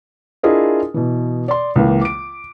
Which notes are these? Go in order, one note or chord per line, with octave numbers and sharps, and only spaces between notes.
D4 E4 F4 G#4 A#4 D#5
B2 E3
D5 C6
C#2 E3 A#3
D6 D7